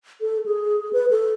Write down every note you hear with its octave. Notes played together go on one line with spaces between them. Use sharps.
A4
G#4
B4
A4